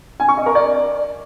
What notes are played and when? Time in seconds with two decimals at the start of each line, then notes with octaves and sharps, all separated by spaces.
0.20 G#5
0.29 C#6
0.37 D#5
0.46 A#4
0.55 D5